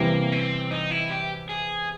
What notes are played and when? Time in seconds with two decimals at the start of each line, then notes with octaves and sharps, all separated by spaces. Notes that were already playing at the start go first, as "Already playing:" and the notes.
Already playing: E2 C3 E3 G3 A#3
0.32 C4
0.71 D#4
0.91 E4
1.10 G4
1.49 G#4